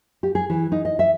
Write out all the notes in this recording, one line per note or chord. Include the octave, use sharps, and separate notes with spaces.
G4
G#4
E3
D#4
D#5
E5